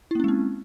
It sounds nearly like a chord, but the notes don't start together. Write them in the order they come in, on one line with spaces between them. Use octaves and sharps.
E4 A#3 C#4 G#3 C4